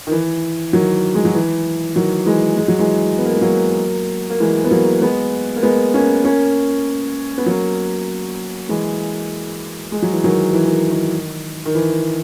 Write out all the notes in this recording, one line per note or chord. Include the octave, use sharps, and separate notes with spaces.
D#3
E3
D#3 F#3
G#3
F#3
E3
D#3 F#3
E3 G#3
G#3
F#3
E3 G#3
B3
A#3
G#3
F#3 A#3
A#3
E3 G#3
B3
F#3 A#3
G#3 B3
A#3
G#3 B3
A#3 C#4
A#3 C#4
B3
F#3 A#3
E3 G#3
G#3
F#3
E3
D#3 F#3
E3
D#3
D#3
D#3
E3